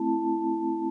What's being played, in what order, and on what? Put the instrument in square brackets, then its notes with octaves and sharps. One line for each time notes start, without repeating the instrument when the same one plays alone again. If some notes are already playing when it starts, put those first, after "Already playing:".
Already playing: [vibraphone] A3 C4 E4 A5